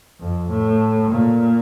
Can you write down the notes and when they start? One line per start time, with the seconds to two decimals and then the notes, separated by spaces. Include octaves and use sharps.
0.20 F2
0.49 A2
1.11 A#2